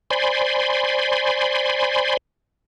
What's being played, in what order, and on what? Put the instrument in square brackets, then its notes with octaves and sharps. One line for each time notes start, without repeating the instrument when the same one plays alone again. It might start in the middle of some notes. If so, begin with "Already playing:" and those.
[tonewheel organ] C5 D5 G#5 B5 C6